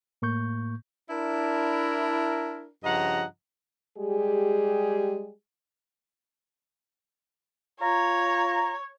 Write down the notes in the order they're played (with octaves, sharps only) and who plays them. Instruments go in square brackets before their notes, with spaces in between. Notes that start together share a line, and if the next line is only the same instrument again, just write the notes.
[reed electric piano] A2 A#3 C#6 G6
[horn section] D4 E4 A#4
G2 C#3 F3 D#5 F#5 A#5
[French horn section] G3 G#3 G4 G#4
[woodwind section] F4 A#5 [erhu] C#5